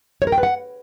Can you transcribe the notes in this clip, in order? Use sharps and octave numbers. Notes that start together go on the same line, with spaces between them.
C#5
A#4
G5
B4
F#5